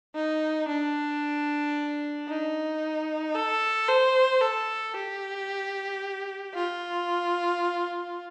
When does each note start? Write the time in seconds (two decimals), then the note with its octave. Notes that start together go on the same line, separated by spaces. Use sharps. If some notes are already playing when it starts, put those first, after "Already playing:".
0.15 D#4
0.68 D4
2.28 D#4
3.35 A4
3.88 C5
4.41 A4
4.94 G4
6.54 F4